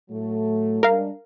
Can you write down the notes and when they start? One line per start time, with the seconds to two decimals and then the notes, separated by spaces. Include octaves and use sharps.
0.10 A2 F#3 A3
0.83 G3 G#3 D4 A#4 F5